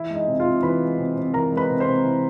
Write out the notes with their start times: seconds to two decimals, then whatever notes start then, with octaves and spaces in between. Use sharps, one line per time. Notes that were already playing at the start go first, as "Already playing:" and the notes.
Already playing: E3 E4 E5
0.10 G#3
0.15 D#4 D#5
0.27 C3
0.40 F4 F5
0.45 C3
0.63 E3 B4 B5
0.81 G#3
0.98 C3
1.17 C3
1.34 E3 A#4 A#5
1.52 G#3
1.57 B4 B5
1.69 C3
1.80 C5 C6
1.87 C3
2.04 E3